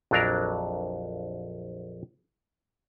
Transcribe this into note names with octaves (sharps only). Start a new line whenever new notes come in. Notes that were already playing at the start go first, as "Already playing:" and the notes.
A#1 F2 F#3 D4 A#4 A#5